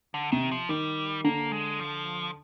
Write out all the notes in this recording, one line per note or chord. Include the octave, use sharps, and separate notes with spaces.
D3
C3 D#3
F3
D#3 G3
D3 A#3
G#3
F3